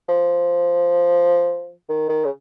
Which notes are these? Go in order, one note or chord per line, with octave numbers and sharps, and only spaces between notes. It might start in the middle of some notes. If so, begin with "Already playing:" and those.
F3
D#3
D#3
C#3